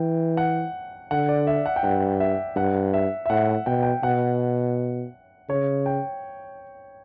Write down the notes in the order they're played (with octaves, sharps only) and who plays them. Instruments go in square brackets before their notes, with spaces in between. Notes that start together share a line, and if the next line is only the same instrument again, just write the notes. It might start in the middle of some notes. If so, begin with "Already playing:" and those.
Already playing: [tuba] E3 [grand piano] G5
[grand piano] F#5
[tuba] D3 [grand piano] F#5
[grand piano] D5
E5
F#5
G5
[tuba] G2 [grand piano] F#5
[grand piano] E5
[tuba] G2 [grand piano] F#5
[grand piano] E5
E5
[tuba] A2 [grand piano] F#5
[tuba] B2 [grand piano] G5
[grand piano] G5
[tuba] B2 [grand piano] F#5
[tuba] C#3 [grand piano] C#5
[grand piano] G5